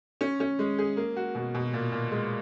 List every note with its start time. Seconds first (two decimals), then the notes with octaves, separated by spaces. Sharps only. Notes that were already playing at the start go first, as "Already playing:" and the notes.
0.21 C#4
0.40 C#4
0.59 G#3
0.78 G#4
0.97 A#3
1.16 F#4
1.35 B2
1.55 B2
1.73 A#2
1.92 A#2
2.11 G#3